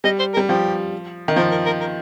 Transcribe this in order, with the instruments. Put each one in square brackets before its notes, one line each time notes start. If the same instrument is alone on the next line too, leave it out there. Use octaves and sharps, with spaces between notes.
[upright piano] G3 [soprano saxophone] D#5
[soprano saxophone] C5
A#4
[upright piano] G3
[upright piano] F3 [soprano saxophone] G4
[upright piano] D#3
[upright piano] F3 [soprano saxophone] A#4
[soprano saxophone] A#4
A#4
A#4